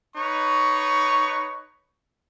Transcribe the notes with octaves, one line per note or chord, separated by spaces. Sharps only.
D#4 B4 C#5 C#6